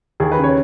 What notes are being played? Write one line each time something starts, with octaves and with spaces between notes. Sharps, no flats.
D#2 G#4
B4
C#3
C#5